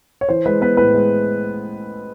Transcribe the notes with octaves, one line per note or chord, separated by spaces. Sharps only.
C#5
E3 C5
G#3 B4
B3 B4
A2 B4
G#3